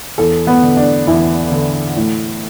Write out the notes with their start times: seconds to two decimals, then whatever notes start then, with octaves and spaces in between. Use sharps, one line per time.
0.18 E2 A4
0.47 B3
0.63 D3
0.77 D4
1.07 E2 E4
1.51 D3
1.96 A2